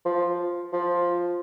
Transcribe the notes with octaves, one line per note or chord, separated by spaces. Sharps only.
F3
F3